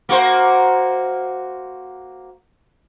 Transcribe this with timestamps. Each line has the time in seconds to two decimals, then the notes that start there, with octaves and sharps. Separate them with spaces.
0.09 A#3 F#4 C5